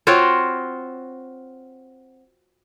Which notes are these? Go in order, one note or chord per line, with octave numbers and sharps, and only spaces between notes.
C4 F4 F#4 C#5